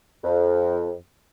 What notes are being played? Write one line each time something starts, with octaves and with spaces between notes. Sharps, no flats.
F2